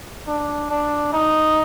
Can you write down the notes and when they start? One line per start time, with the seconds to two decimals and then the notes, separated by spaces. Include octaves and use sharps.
0.27 D4
0.70 D4
1.13 D#4